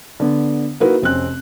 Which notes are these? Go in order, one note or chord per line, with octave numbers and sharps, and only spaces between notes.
D3 B3
A#3 D#4 E4 F#4 A#4 B4
F1 C4 C#4 F#6